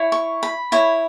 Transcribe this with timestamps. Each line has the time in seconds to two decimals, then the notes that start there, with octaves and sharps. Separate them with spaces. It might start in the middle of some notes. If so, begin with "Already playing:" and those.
Already playing: E4 C#5
0.12 C#6
0.43 B5
0.72 E4 C#5